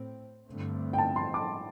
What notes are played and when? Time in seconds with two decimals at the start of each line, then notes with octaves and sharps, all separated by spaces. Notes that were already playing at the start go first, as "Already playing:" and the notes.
Already playing: A2 C4
0.47 G2 D3 A3 C4
0.93 G5
0.98 A5
1.16 C6
1.34 D6